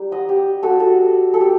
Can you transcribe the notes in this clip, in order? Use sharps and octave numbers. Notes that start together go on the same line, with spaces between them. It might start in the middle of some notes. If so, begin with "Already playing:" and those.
Already playing: G3 D#4
D#5 F#5
G4
F#4 A4
F#4 A4
A4
G4